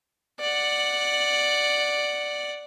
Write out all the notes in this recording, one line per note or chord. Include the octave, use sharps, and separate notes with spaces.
D5 F#5